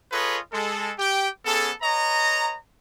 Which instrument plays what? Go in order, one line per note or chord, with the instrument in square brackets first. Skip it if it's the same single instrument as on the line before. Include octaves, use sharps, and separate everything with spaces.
[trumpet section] F4 G#4 A4 B4 C#5 D#5
G#3 A4
G4 G5
B3 C#4 G#4 A4
B4 C#5 D#5 A#5